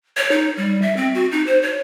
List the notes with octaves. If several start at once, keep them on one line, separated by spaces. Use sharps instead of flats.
C#5
D#4
G3
E5
C4
F#4
D#4
C5
C#5